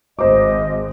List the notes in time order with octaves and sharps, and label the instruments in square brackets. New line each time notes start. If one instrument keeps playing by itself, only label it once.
[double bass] G#1 [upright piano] C5 D6 [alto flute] D#5